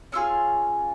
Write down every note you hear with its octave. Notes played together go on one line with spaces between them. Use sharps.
C#4 F4 G#4 E6